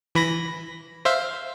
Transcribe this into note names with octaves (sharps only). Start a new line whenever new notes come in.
E3 B5 A#6
C5 E5 F5